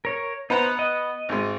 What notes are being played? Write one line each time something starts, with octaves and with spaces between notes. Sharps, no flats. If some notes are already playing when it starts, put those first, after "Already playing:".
A#4 C#5
B3 D#4 B4 C5 F#5 A#5
D#5
G#1 G#3